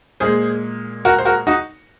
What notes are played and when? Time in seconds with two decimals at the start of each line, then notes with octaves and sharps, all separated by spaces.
0.20 A#2 G#3 G#4 C5
1.05 F#4 A#4
1.18 C5
1.25 F#4 A#4
1.47 D#4 F#4